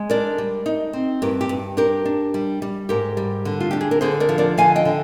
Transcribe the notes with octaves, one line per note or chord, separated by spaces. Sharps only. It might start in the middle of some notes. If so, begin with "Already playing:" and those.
Already playing: G#3
D4 A#4 D5
G3
D#4
C4
G2 G4 A#4
G4
G2
D4 G4 A#4
D4
G3
G3
G#2 G4 A#4
G3
D3
F4
D4 G4
G#4
A#4
D3 G#4 C5
A#4 D5
F3
A#4 D5
D3 F5 G#5
D#5 G5
D3